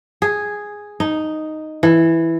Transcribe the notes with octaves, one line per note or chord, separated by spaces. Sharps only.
G#4
D#4
E3